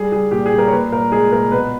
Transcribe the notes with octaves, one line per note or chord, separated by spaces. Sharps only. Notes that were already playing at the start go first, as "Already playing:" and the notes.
Already playing: G3 G#4
G3 G#4
A#2 G4
G#4
G3
A#4
C#5
A#2 B4
A#2 A#4
G#3 G#4
A#2 A#4
B2 B4